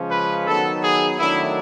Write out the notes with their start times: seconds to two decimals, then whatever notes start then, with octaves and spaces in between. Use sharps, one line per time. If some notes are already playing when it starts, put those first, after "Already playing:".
Already playing: C#3 F3 G#3 C#4
0.10 B4
0.46 D#3 F#3 B3 D#4 A4
0.83 G#4
1.18 D#3 F#3 A3 D4 E4